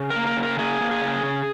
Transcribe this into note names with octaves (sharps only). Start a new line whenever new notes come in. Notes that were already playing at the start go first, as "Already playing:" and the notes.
Already playing: C#3
A#4
A#3
A#4
C#3
A#4
A#3 G#4
A#3
G#4
C#3
C#3